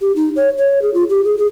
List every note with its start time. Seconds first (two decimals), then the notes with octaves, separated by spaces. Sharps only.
0.01 G4
0.16 D#4
0.36 C#5
0.58 C#5
0.82 G#4
0.94 F4
1.09 G4
1.25 G#4
1.38 G#4